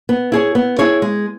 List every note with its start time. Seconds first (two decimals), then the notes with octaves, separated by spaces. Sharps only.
0.09 B3
0.32 E4 G#4 C#5
0.55 B3
0.79 E4 G#4 C#5
1.02 G#3